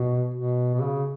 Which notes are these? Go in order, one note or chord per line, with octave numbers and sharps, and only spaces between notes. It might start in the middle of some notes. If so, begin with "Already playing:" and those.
Already playing: B2
B2
B2
C#3